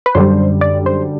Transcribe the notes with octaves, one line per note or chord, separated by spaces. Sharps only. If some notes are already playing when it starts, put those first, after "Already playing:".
B4
F#2 D3 G3 C5
D5
C5